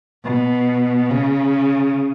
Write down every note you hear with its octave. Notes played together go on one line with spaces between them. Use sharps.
B2
C#3